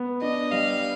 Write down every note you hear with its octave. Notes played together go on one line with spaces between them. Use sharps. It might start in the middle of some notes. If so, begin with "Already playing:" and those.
Already playing: B3
D4 D#5
G3 F5